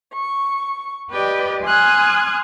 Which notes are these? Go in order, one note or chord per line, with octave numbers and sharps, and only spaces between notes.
C#6
G4 B4 D5 D#5 G5
G#5 C6 D#6 F6 F#6 G#6